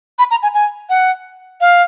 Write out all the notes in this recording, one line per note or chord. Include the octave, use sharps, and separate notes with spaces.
B5
A#5
G#5
G#5
F#5
F5